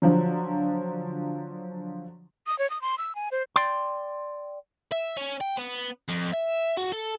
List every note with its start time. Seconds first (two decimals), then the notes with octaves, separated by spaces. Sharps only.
0.02 D3 F3 F#3
2.47 D#6
2.59 C#5
2.70 D#6
2.82 C6
2.98 E6
3.15 G#5
3.32 C5
3.56 D5 G5 C6
4.92 E5
5.17 C#4
5.41 G5
5.57 B3
6.08 F2
6.33 E5
6.77 F#4
6.92 A4